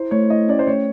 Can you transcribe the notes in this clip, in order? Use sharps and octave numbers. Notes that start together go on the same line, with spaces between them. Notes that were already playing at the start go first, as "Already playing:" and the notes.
Already playing: E4 C5
A3 C#5
E4 D#5
C#4 D5
C5
A3 C#5